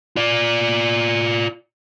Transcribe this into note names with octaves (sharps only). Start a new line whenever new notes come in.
F4 D5